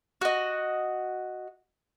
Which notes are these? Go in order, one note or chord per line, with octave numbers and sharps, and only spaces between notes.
F#4 D#5